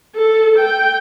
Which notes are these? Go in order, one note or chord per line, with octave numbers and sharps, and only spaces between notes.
A4
G5